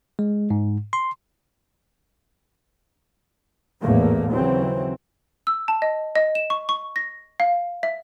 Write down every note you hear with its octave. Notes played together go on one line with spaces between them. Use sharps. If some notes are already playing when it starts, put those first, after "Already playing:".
G#3
G#2
C6
G#1 E2 A2 A3 A#3
D#2 C#3 E3 F#3 C4
E6
A5
D#5
D#5
E7
C#6
C#6
A#6
F5
E5